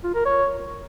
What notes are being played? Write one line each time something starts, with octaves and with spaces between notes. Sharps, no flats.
F4
A#4
C#5